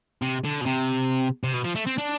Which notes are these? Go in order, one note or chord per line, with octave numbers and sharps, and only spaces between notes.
C3
D3
B2
C3
C3
B2
F3
A3
C4
D4